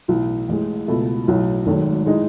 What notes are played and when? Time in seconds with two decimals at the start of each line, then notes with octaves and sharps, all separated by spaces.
0.08 B1 A2 E3
0.48 A1 A2 E3 G#3
0.88 C#2 B2 A3
1.28 B1 A2 F#3
1.66 G#1 G#2 D#3 F#3 A3
2.06 A2 G#3 D#4